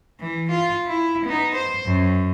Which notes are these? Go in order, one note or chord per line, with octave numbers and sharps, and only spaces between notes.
E3
F4
E4
B3 D#4
C5
F#2